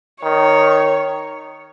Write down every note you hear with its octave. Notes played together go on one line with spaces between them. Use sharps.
D#3 C#5